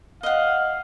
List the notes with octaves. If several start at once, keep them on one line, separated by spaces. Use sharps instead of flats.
D#5 F5 F#5